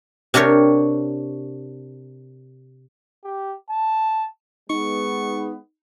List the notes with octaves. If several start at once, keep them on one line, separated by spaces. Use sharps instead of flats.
C3 D4 G4 A#4 C#5
G4
A5
G#3 B3 D#4 C#6